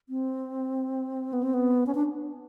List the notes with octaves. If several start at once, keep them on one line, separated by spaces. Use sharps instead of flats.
C4
B3
C4
B3
C#4
D4